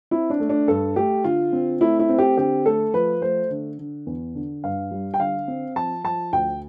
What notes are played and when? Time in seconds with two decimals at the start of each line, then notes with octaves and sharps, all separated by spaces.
0.11 C4 E4
0.30 D4
0.40 A3
0.49 D4
0.68 G2 A4
0.96 A3 G4
1.24 D3 F4
1.53 C4
1.81 A3 E4
1.99 E4
2.09 C4
2.18 G4
2.37 D3 G4
2.65 A3 A4
2.94 F3 B4
3.22 A3 C5
3.51 D3
3.79 D3
4.06 E2
4.35 D3
4.64 G2 F5
4.91 G3
5.14 G5
5.20 D3 F5
5.48 C4
5.76 F3 A5
6.04 F3 A5
6.33 D2 G5